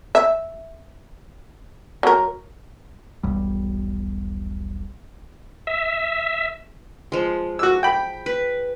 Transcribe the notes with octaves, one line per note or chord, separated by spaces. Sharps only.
E5
F#3 A#4
E1 B1 G3
E5
F3 G#3
F#4 E6
G5 B5
B4